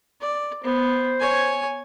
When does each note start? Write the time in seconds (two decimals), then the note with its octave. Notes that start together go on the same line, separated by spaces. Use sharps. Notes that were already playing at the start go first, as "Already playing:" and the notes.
0.21 D5
0.63 B3 C5
1.19 C#5 G#5